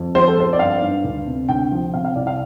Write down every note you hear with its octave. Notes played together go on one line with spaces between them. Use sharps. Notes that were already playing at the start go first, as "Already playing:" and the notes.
Already playing: F2
F3 C5
A4
F2 C5
D5
G2 F5
G2
D2
C3
D2 G5
F3
C3 F5
F5
C2 D5
F5